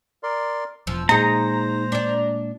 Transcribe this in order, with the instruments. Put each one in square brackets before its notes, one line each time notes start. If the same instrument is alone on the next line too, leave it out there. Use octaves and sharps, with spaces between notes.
[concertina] A#4 D5 C6
[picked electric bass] E1 [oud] F3 [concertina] E6
[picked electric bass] A#2 G#3 [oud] D#4 G#4 [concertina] C5 [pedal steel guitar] A#5
[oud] D4 D5